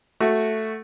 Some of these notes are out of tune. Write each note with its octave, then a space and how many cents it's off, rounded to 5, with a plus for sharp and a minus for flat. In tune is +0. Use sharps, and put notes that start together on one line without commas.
A3 +0 F#4 +0